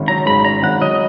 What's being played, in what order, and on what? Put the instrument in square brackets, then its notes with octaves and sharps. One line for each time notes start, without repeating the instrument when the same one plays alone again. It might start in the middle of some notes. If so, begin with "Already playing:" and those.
Already playing: [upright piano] G#1 G#2 C#4
[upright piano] F#3 [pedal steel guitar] A#5
[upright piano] G#2 [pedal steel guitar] B5
[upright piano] C#4 [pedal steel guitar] A#5
[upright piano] G#1 [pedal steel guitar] F#5
[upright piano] F#3 [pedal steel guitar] D#5